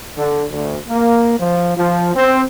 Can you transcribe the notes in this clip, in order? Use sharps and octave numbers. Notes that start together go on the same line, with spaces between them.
D3
D2
A#3
F3
F3
C4